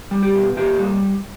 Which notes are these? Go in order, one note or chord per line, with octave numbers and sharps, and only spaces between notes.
G3
G4
B2
A#2 G4
G3